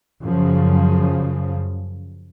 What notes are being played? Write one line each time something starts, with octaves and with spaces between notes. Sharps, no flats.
F#2 C#3 F3